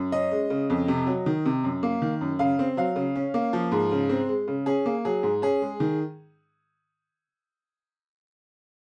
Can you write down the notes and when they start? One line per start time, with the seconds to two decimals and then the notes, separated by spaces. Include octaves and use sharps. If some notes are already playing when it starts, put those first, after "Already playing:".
Already playing: F#2
0.12 C#4 D#5
0.31 G#3
0.50 C#3
0.70 F2
0.88 C3
1.07 F#3
1.26 D#3
1.45 C3
1.64 F#2
1.83 A#3
2.02 D#3
2.21 F#2
2.39 C#3 F5
2.59 C4
2.77 F#3 F5
2.96 C#3
3.15 C#4
3.34 A#3
3.53 F3
3.72 G#2
3.91 C#3
4.10 C4
4.29 G#3
4.48 C#3
4.66 C#4 G#4
4.86 A#3
5.05 F#3 G#4
5.23 G#2
5.42 C#4 G#4
5.62 G#3
5.80 D#3